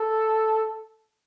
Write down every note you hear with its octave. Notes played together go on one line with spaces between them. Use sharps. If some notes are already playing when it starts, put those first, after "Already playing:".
Already playing: A4